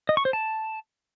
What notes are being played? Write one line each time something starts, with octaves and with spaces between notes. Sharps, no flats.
D#5
C#6
C5
A5